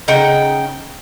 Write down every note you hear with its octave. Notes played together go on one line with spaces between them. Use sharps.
C#3 D#4 F#5 G5